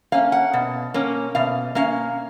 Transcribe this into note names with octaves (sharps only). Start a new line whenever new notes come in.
A#3 C#4 F5
F#5
B2
A#3 C#4
B2 F5
A#3 C#4 F5